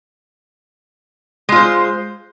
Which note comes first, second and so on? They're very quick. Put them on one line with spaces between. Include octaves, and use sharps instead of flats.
G#3 F4 C5